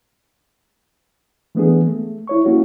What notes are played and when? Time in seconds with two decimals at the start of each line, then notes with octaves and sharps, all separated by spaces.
1.55 E3 A3 B3 D4 G#4
1.88 A3
2.28 E4 C#5 C#6
2.46 A#3 C#4 E4 F#4